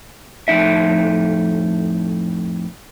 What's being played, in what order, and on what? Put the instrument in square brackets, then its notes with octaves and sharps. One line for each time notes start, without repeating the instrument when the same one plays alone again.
[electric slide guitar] F2 A2 D#4 E5